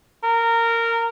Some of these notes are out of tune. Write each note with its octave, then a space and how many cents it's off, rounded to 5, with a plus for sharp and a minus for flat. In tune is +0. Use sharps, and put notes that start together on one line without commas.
A#4 -15